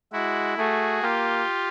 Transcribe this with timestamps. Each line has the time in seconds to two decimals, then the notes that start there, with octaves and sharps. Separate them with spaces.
0.12 G#3 E4 F#4
0.57 A3 F#4 G#4
1.02 A#3 F4 G4